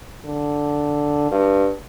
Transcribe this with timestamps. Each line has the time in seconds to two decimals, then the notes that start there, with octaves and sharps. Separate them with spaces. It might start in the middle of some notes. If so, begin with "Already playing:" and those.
0.25 D3
1.31 G2